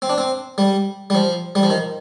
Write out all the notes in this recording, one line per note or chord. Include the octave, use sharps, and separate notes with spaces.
C4
D4
C4
G3
G3
F3
G3
F3
D#3